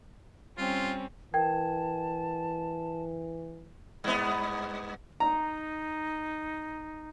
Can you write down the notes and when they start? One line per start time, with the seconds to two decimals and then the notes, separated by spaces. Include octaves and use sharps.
0.57 G3 C4 C#4 F4
1.34 E3 A#4 G5 A5 G#6
4.04 G2 B3
5.20 D#4 A#5